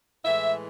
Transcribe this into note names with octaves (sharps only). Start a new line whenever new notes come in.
A2 E3 G#3 E5